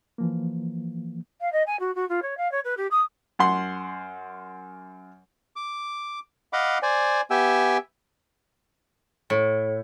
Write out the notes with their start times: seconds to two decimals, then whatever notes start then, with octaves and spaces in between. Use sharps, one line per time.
0.18 E3 F3 A#3
1.41 F5
1.52 D#5
1.66 G#5
1.80 F#4
1.95 F#4
2.09 F4
2.22 C#5
2.37 F5
2.51 C#5
2.64 B4
2.77 G4
2.91 D#6
3.39 F#2 F#5 C6
5.56 D6
6.53 D#5 F5 F#5 B5 D6
6.83 C5 D5 G#5
7.30 B3 G4 E5 G5 G#5 E6
9.30 A2